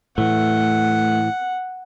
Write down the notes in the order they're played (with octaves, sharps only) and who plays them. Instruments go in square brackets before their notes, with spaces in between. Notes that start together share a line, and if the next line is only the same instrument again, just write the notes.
[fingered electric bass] A2 E3 [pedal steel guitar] A3 [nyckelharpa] F#5